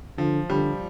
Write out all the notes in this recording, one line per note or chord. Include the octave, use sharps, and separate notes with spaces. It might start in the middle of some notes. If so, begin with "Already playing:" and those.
D3 F3
D3 G3